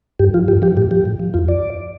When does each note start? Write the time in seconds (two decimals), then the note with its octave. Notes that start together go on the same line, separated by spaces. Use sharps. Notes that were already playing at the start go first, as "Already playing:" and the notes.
0.19 G2 G4
0.34 F3 F4
0.48 G2 G4
0.62 F3 G4
0.77 A2 G4
0.91 F3 G4
1.05 A2
1.19 F3
1.34 F2 F4
1.48 D5